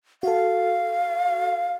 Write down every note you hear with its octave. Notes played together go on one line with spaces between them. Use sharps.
F#4 A4 F5